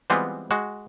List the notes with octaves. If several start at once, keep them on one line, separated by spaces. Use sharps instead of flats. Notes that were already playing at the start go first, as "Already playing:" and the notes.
E3 G3 G#3 B3 C4 F4
G#3 F#4